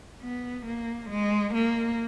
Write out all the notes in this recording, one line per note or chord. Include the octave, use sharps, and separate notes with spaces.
B3
A#3
G#3
A#3